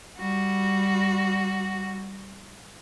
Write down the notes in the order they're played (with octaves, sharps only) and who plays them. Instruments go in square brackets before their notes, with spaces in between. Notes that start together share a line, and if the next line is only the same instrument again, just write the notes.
[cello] G3 F#4